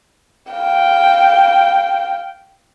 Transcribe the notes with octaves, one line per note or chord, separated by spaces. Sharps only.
F5 G5